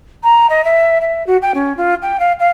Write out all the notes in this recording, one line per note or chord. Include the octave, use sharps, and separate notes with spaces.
A#5
D#5
E5
E5
F#4
G5
C#4
F4
G5
F5
F5